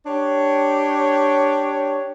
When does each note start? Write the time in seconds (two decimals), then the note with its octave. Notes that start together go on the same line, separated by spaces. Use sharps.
0.06 D4 G4 C#5